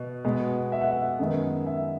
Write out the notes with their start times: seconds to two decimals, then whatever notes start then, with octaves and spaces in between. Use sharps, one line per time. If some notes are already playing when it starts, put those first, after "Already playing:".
Already playing: B2
0.25 B2 G#3 B3
0.72 E5
0.81 F#5
0.91 E5
1.19 F#2 D#3 G#3 B3
1.66 E5